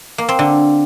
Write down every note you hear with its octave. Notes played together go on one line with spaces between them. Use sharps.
A#3
C4
D3